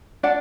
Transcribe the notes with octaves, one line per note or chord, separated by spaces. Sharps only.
D4 D5 F#5